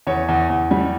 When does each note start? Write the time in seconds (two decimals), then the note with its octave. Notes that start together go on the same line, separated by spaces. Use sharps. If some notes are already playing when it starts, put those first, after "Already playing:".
0.07 E2 C#5
0.28 E2
0.50 E2
0.71 G3